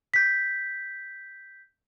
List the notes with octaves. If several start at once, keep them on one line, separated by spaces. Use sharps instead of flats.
G6 B6